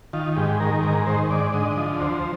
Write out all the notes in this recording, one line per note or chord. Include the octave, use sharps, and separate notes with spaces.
D#3 F4
G#2 G4
D#3 A#4
G#2 A#4
D#3 C5
G#2 D5
D3 D#5
F3
D2 C5